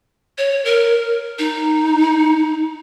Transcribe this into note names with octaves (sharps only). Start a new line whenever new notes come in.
C#5
A#4
D#4